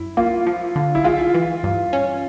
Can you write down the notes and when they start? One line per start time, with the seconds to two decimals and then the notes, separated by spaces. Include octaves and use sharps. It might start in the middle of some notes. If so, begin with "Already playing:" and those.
Already playing: F#2 E4
0.17 A#3 F4
0.47 F3
0.76 D3
0.95 E4
1.04 G#3 F4
1.34 E3
1.63 G2
1.93 C#4